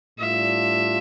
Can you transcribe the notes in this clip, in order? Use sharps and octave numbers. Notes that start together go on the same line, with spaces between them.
A2 G3 D4 F4 E5